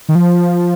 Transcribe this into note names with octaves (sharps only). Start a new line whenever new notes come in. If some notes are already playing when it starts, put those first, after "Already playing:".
D#3
F3